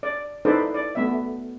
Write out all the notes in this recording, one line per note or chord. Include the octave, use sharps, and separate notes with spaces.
D5
D#4 E4 A4 B4 C5 D5
D5
A3 B3 E5